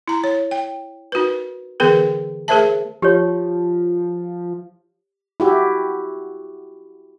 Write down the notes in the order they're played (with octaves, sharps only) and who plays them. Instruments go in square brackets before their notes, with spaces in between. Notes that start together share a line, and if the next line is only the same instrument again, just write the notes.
[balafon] E4 A#5
C#5
G5
D#4 F#4 A#4 B4
D3 E3 B3 G#4 A#4 B4
A3 G#4 A#4 C5 E5 A5
[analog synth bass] F3 [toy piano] G4 C#5
[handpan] E4 F#4 G4